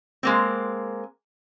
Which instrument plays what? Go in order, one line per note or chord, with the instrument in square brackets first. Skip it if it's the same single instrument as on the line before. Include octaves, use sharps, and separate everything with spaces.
[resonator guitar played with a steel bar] G#3 A#3 C4